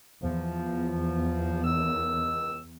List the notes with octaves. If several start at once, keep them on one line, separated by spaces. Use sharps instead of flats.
E2 F3
C#2 D#3 E6